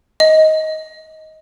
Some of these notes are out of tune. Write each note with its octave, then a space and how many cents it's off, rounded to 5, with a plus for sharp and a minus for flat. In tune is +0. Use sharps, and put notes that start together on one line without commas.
D#5 +15